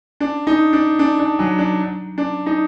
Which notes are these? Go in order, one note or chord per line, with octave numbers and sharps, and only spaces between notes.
D4
D#4
D4
D4
D4
F#3
D4
D4
D#4